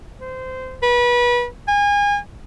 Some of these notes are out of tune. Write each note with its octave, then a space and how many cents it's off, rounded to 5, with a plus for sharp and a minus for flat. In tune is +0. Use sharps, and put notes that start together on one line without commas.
C5 -20
B4 -30
G#5 -30